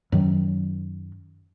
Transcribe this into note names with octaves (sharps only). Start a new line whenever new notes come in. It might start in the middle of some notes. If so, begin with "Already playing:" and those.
F#2 D#3 F#3